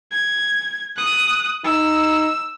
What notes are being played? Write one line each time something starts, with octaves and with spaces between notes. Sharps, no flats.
G#6
D#6 F#6
D#4 E6